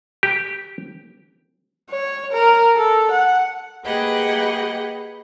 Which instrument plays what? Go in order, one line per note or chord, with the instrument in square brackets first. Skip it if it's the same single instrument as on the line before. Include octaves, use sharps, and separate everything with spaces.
[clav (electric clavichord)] G4
[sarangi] C#5
A#4
A4
F#5
[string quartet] A#3 G4 G#4 B4 D#5 F#5